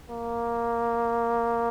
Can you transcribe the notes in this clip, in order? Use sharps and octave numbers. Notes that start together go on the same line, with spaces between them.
A#3